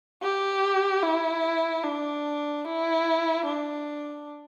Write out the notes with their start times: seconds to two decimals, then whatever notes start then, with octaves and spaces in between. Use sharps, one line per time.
0.23 G4
1.03 E4
1.84 D4
2.65 E4
3.45 D4